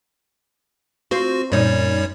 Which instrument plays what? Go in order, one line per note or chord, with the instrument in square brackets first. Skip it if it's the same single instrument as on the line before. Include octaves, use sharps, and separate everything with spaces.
[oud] C4 F4 C5 [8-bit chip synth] F#4
[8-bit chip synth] F#2 G3 C#5 [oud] A#2 D#4